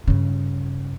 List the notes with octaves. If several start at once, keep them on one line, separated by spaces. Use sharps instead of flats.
G2 C#3